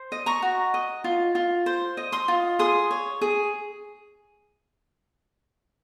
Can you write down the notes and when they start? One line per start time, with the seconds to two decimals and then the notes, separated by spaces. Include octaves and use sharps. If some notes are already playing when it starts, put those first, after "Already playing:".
Already playing: C5
0.12 D#5
0.26 A#5 C#6
0.42 F#4
0.74 D#5
1.04 F4
1.35 F4
1.66 C5
1.97 D#5
2.12 C6 D#6
2.28 F4
2.59 G#4 C6 D#6
2.91 C#5
3.21 G#4